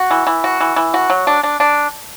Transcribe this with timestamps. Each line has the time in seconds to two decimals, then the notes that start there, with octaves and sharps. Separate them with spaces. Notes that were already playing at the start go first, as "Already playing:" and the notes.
Already playing: F#4
0.11 E3
0.27 E3
0.44 F#4
0.60 E3
0.76 E3
0.94 F#4
1.10 F#3
1.27 D4
1.43 D4
1.60 D4